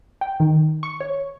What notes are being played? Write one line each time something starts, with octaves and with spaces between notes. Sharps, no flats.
G5
D#3
C#6
C#5